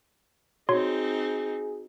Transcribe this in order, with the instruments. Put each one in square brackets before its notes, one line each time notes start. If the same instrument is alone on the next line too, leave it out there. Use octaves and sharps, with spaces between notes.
[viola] C4 D#4 [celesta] F#4 [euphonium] G#4 [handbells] C#5 C6